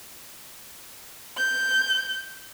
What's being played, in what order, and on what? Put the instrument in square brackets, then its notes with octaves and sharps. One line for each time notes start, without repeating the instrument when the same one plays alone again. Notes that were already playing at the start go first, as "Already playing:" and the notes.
[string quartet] G6